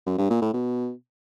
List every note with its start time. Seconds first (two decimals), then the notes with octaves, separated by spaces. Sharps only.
0.06 F#2
0.18 G2
0.30 A#2
0.42 A2
0.53 B2